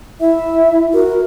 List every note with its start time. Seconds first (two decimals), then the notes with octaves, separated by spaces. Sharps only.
0.21 E4 E5
0.93 F#4 A#4